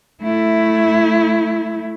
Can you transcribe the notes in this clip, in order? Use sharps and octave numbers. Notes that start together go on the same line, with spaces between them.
A3 E4